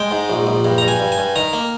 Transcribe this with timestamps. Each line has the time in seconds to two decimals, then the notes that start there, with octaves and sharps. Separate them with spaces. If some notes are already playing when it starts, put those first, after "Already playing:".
Already playing: G#3 G5
0.11 G#2
0.30 A#1
0.47 A#1
0.65 G2
0.78 G2 A#5
0.88 G#5
1.00 G2
1.12 G#5
1.18 G2
1.36 D#3 A#5
1.53 A#3